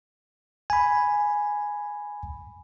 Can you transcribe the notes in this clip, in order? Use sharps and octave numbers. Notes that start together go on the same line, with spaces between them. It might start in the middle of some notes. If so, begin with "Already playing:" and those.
G#5 B5